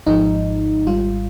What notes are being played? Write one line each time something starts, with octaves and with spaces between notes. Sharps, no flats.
G#1 G#2 F3 G#3 D#4
G#1 G#2 G3 F4